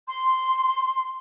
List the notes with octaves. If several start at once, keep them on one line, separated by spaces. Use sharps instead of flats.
C6